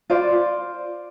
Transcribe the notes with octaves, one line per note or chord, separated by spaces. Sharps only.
F4 C5 D5